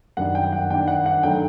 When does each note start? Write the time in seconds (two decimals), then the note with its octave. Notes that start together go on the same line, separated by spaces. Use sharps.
0.17 F#2 D#3 G3 D4 F#5
0.35 G5
0.52 F#5
0.70 D#3 G3 D4 G5
0.88 F#5
1.06 F#5
1.23 G2 D3 F#3 A3 D#4 G5